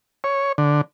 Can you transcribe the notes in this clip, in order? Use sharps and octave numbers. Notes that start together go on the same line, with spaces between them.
C#5
D3